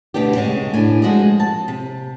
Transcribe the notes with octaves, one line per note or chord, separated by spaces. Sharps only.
D2 B2 B3 D4 G4
G#2 C#3 G#3
A2 D4 G#5
F3 G#3 F#4 G#4 D#5
A5
C3